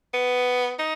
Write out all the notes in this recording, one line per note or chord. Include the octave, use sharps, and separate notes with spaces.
B3
D#4